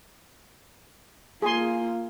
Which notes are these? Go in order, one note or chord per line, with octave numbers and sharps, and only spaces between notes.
A#3 F4 G#4 G#5 C6